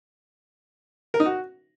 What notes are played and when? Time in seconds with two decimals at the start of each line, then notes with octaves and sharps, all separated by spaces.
1.14 A#4
1.20 D#4
1.26 F#4